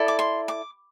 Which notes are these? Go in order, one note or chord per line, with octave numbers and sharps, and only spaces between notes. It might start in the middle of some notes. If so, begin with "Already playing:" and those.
Already playing: E4 A4 D5
D6
C6
D6